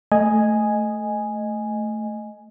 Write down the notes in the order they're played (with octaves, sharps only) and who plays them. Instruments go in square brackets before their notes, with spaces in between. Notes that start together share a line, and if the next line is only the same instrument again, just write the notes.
[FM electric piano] A3 D#5 G#5